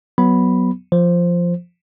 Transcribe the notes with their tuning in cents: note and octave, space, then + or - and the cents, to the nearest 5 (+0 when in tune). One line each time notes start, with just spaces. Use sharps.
F#3 +0 B3 +0 B5 +0
F3 +0 C5 +0